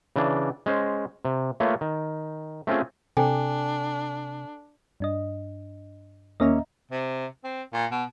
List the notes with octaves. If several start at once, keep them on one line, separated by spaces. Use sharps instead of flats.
C#3 E3 D4
G#3 C#4 C5
C3
A3 A#3 F4 B4 C#5
D#3
A3 C4 C#4 F4 G#4
C3 D4 A4 G5 G#5
G2 D4 D#5
D#2 A#3 C#4 D#5 E5 A#5
C3
C4
A#2
B2